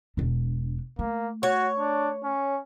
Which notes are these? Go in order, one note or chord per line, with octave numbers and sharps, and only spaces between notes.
E1 D4
A3 A#3
F#4 C#5
D4
C#4